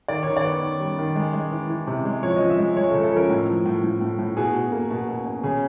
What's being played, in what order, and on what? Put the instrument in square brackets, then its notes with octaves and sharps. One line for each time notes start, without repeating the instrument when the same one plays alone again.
[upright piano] D#3 D5
D#3 C#5
D5
B3
D#3
G3
D#3
G#3
G#3
E3
E3
C3
G#3
F3 C#5
F3 D#5
E5
G#3
G#3 C#5
A4
C#3
A4
F3 A#4
A2
F3
A2
A2
A2
A2
B2 G#4
B2
A#3
B2
B2
B2
C#3 G#4